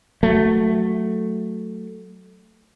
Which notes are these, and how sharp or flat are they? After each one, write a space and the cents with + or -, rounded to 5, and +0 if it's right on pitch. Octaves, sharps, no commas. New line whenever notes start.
F#3 +0 A3 +0